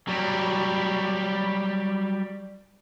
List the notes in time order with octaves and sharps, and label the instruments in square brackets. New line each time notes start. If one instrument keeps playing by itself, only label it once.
[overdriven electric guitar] F#3 G3